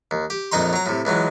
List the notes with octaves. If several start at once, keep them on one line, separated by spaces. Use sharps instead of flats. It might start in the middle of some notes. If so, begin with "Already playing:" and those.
D#2
G4
A#1 F2 D#4 A#5 C6
F#3 A#5
A2 C3
C#2 E3 F#3 G#3